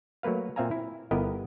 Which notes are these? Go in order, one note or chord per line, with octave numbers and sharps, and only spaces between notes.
F#3 A3 A#3 B4 F5
A#2 C4 E5 F5 G#5 A#5
E4
G1 B3 E4 G4 A#4 D#5